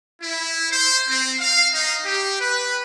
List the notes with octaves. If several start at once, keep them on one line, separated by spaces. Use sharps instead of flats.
E4
C5
C4
F5
D#4
G4
B4